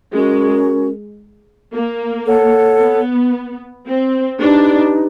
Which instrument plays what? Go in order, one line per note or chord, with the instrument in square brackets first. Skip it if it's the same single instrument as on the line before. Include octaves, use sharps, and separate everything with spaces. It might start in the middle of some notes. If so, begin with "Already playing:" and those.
[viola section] G#3 [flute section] C#4 F#4 A#4
[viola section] A#3
[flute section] A4 C#5 F#5
[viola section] B3
C4
[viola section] D4 [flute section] D#4 G4 B4